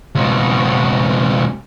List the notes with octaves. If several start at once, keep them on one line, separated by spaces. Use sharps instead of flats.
C#2 B2